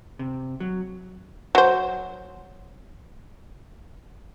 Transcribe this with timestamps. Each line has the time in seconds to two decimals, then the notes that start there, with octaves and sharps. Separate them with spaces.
0.19 C3
0.60 F#3
1.55 F#3 C5